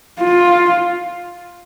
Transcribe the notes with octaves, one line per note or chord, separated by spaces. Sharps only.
F4